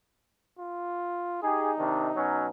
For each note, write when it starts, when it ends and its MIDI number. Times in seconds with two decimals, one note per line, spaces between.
0.59 1.42 65
1.43 2.50 63
1.43 1.71 67
1.43 1.71 68
1.78 2.09 48
1.78 2.09 51
1.78 2.09 62
2.16 2.48 47
2.16 2.48 54
2.16 2.48 61